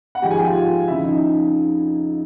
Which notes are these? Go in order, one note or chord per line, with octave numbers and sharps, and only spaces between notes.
F#5
G#2 F3 G4 G5
G#4 G#5
G4 G5
F4 F5
F2 C#3 F3 E4 E5
D#4 D#5